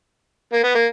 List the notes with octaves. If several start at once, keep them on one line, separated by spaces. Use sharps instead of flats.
A#3
B3
A#3